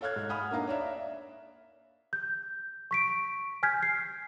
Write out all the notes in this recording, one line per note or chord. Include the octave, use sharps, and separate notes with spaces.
A4 C#5 F5 F6 F#6 G#6
G#2
F#5 G#5 B5 D#6 F6
A#3 D4 D#4 F5 A#5
C#5 D5 E5 F5
G6
C#6 B6 D7
G#5 F6 G6 G#6 B6
C7